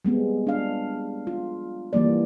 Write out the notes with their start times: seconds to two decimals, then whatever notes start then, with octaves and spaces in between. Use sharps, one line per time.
0.05 G3 G#3 B3 C4
0.47 D4 F5
1.27 F4
1.93 E3 G3 A#3 D5